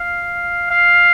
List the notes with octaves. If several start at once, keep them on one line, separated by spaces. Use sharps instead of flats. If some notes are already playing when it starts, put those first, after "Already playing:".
Already playing: F5
F5